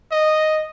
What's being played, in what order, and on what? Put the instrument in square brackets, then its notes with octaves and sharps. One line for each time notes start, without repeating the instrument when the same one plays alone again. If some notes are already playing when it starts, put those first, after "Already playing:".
[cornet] D#5